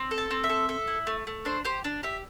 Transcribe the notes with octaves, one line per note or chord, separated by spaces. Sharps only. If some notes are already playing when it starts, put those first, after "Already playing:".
Already playing: C4
A4
A5
C4
E5
A4
A4
E4
A3
A3
D4 C5
G4 C5
D4
G4 E5